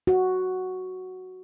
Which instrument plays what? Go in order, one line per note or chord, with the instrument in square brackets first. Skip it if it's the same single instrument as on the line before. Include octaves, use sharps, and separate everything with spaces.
[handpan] F#4